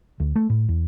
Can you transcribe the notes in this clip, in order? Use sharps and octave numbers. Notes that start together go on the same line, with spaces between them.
D2
A3
A2
E2